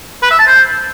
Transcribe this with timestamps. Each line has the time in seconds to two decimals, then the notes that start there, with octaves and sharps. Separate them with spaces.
0.23 B4
0.31 E5
0.39 A5
0.47 C5